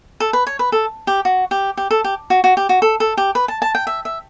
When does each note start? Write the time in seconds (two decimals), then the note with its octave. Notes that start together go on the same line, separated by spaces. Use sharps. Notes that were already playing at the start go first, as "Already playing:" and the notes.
0.20 A4
0.33 B4
0.47 C#5
0.59 B4
0.72 A4
1.07 G4
1.25 F#4
1.51 G4
1.77 G4
1.91 A4
2.04 G4
2.30 F#4
2.44 F#4
2.57 G4
2.69 F#4
2.82 A4
3.00 A4
3.17 G4
3.35 B4
3.48 A5
3.62 A5
3.75 G5
3.87 E5
4.05 E5